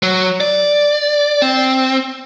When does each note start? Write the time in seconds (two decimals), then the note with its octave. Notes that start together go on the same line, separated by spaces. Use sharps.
0.03 F#3
0.41 D5
1.42 C4